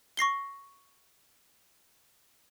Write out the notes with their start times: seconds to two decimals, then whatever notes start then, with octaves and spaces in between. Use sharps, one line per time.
0.17 C#6 A#6 C7 G7